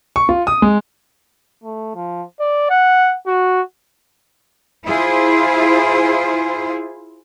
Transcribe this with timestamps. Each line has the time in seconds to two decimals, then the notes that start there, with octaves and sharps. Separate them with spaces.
0.16 C#6
0.29 F4
0.47 D#6
0.62 G#3
1.63 A3
1.95 F3
2.40 D5
2.70 F#5
3.27 F#4
4.88 E4 F4 G#4 C5